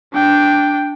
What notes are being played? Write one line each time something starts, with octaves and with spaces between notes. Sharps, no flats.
D4 G5